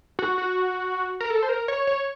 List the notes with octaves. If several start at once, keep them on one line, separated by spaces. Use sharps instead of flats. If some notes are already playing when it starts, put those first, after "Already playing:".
F#4
F#4
A#4
A4
C5
A#4
C#5
C#5